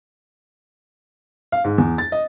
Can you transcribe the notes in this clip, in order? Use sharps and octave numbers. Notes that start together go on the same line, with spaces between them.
F5
G#2
E2
A6
D#5